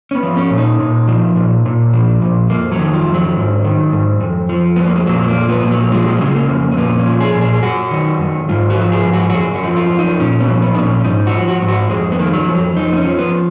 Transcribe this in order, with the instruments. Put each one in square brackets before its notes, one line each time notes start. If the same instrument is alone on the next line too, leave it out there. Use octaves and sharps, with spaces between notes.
[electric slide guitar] C#4
B3
F3
C#4
A#2
D#4
A#2
F3
A#2
A#2
F3
A#2
F2 A#3
F#3
D#3
F3
F2
F#3
G#2
D#3
G#2
F2
F3
F2 B3
A#3
G#3
A#2 F#3
B3
A#3
F3
B3
A#2
F#3
F3 G#3
F3
F#3
C#3 G#3
A#3
F2
C#4
A#2 B3
C#4
F3
G#4
A#2
G#4
G#4
F#2 F#4
D#3
F#2
G#2 F4
F#4
F3
G#4
G#2
F#4
F#4
F#2 G#4
F#4
F3
F4
F#2
D#4
A#2 C#4
B3
F3
B3
A#2 D#4
C#4
F4
G#2 D#4
F#4
F3
F#4
G#2
F#4
F2 G#3
B3
D#3 A#3
G#3
F#3
F2 F3
F#3
F2 D#4
B3
C#4
F3
B3